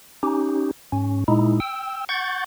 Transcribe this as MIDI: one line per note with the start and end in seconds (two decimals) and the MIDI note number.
0.23 0.71 61
0.23 0.71 63
0.23 0.71 67
0.92 1.24 44
0.92 1.24 61
1.28 1.60 46
1.28 1.60 56
1.28 1.60 63
1.28 1.60 64
1.60 2.05 79
1.60 2.05 88
2.09 2.44 78
2.09 2.44 85
2.09 2.44 91
2.09 2.44 93